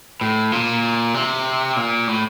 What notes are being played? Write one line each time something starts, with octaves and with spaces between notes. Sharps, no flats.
A2
A#2
C3
A#2
A2